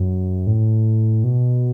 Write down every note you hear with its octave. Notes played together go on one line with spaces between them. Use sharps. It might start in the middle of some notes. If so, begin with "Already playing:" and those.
Already playing: F#2
A2
B2